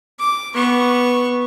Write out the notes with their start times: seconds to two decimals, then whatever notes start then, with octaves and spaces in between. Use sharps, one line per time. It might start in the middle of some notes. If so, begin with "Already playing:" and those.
0.19 D6
0.54 B3 C#6